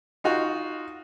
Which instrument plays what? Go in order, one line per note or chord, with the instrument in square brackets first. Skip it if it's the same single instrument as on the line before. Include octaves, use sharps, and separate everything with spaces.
[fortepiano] D#4 F4 F#4